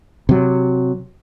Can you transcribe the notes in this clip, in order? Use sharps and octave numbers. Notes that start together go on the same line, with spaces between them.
C3 F#3